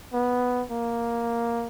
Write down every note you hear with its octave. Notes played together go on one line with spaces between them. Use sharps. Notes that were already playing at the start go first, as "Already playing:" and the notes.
B3
A#3